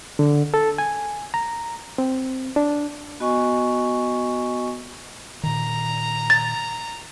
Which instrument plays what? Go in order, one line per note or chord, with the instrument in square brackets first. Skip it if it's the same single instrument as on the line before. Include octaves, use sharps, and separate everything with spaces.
[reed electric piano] D3
A4
G#5
A#5
C4
D4
[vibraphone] B3 F#4 D#5 G#5 C#6
[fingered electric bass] A#2 D#3 [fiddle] A#5
[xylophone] A6